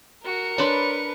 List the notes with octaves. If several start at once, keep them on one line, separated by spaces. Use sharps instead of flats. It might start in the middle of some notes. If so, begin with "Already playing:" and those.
F#4 A#4 C#7
D4 B4 C#5 B5 C6